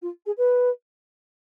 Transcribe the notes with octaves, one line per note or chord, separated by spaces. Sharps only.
F4
G#4
B4